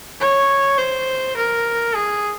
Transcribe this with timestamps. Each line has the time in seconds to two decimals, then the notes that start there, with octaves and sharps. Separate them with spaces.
0.20 C#5
0.78 C5
1.37 A#4
1.95 G#4